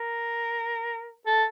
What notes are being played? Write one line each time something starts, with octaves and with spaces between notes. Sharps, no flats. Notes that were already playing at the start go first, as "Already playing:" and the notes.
Already playing: A#4
A4